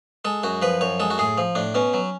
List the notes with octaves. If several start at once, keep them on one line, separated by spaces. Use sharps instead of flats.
G#3 A4
F#2 F#4
F3 B4
F#2 C#5
G#3 A4
F#4
A2 G#4
F3
A2 D4
B2 C#4
F#3